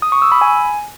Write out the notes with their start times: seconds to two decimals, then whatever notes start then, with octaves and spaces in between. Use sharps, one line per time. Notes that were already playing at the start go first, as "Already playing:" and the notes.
0.02 D#6
0.12 C#6
0.22 E6
0.32 B5
0.41 G#5